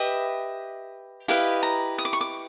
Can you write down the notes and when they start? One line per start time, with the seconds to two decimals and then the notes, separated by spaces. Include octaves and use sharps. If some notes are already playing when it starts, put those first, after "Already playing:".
Already playing: G4 B4 D#5 E5
1.28 E4 G4 B4 D#5 F5
1.63 A#5
1.98 D#6
2.05 D6
2.13 C#6
2.21 D6